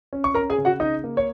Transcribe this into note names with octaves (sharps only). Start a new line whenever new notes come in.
C#4
C#6
C#4 A#4 A#5
G#4 G#5
C#3
F#4 F#5
C#3 D#4 D#5
A#3
C#5